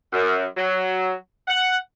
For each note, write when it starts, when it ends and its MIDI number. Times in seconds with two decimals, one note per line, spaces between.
0.13 0.44 42
0.57 1.12 54
1.48 1.76 78